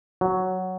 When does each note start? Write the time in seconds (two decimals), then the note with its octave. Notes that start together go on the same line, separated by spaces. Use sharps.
0.21 F#3